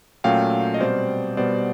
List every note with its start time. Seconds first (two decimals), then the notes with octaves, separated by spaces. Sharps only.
0.24 A#2 F#3 A3 C#4 F5 G5
0.74 D#5
0.80 B2 G3 C4 C5 D5
1.37 B2 G3 B3 C5 D5